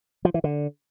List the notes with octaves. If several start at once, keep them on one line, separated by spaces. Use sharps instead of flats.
F3
E3
D3